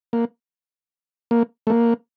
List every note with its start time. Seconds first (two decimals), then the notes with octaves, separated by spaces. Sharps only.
0.13 A#3
1.31 A#3
1.67 A3
1.70 A#3